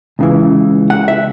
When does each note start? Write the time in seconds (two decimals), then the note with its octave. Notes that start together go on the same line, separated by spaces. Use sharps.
0.19 C#2 C#3 E3
0.90 F#5
1.08 E5